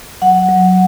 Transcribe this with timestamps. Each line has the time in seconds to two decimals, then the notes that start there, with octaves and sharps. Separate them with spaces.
0.22 F#3 F#5
0.49 F#3